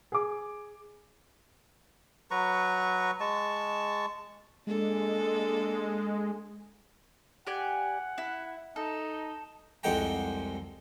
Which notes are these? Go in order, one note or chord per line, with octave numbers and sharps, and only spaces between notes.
G#4 D6
F#3 B4 A#5 C#6
G#3 A5 C#6
G#3 A#3 D4 A4
G4 D5 F#5 G#5
E4
D#4 A4
C2 F2 G#3 F#5 G5 A#5